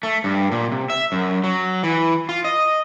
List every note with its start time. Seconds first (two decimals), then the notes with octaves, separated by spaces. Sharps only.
0.03 A3
0.24 G2
0.52 A#2
0.72 C3
0.90 E5
1.12 F#2
1.44 F#3
1.83 E3
2.29 F4
2.44 D#5